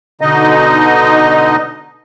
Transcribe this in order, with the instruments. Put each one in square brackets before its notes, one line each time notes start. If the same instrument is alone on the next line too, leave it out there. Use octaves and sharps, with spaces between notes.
[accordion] B2 D3 D#4 D#5